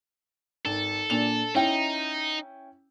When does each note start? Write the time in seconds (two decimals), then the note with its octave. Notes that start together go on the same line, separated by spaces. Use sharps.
0.65 G#1 A4
1.10 A#2 D4 F7
1.55 C#4 D#4 E4 G5